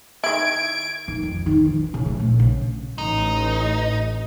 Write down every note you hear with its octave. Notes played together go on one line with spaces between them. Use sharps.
D#3 E4 G#6 D7
D#3
F2
D#3
E3
C#3
A3
A#1
C#3
A1 D#4